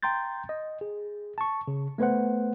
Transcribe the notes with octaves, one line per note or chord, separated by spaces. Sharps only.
G5 A#5 C6 G6 A6
D#5
G#4
A5 C#6
C#3
A3 B3 B4 C5 F#5